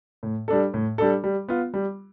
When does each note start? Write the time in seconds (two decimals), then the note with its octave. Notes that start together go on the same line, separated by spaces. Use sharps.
0.23 A2
0.48 G3 D4 A4
0.74 A2
0.98 G3 D4 A4
1.24 G3
1.48 B3 F4
1.74 G3